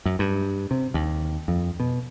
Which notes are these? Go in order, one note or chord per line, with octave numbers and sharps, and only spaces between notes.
F#2
G2
C3
D#2
F2
B2